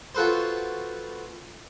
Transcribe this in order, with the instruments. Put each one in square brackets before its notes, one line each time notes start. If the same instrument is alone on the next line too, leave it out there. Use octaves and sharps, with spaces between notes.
[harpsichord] F4 F#4 A4 B4 C5